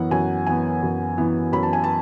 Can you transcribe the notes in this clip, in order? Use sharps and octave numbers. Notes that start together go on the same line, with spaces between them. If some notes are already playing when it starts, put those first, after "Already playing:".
Already playing: F#2 E3 B3 F#5
F#2 G#5
E3 B3 G#5
F#2
E3 B3
F#2 B5
A5
G#5
A5